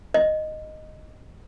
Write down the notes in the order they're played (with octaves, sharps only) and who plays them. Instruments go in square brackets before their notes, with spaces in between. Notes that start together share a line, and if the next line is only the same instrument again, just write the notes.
[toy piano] D#5